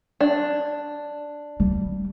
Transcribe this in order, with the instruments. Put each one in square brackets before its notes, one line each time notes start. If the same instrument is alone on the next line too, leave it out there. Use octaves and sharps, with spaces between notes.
[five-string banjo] D4
[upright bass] G3